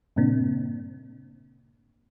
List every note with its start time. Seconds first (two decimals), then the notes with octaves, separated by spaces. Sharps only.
0.16 G2 A#2 C#3 A#3 C4 D4